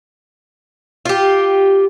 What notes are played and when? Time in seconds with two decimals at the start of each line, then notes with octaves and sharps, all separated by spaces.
1.05 F4 G4